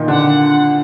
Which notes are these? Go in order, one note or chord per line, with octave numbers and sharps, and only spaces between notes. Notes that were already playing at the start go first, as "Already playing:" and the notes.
Already playing: A#2 D#3 D#4
D3 D4 F#5